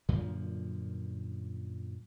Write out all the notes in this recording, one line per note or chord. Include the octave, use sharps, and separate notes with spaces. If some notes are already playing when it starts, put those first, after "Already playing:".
F#2 A#2 D3 F3